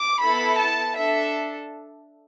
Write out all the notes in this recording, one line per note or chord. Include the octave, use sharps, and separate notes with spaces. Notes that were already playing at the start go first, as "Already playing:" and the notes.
Already playing: D6
B3 E4 A4 B5
A5
D4 A4 E5